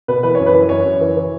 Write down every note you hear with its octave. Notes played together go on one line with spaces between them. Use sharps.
B2 B4
E3 B4
F#2 C#5
B4
E3
F#2 C#5
F#2
E3
E3